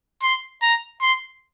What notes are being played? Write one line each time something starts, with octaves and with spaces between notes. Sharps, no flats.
C6
A#5
C6